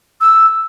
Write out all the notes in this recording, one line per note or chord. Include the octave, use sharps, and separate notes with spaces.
E6